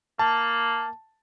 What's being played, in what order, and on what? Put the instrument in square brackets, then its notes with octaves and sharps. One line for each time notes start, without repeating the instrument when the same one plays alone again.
[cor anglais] A#3 [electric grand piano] A5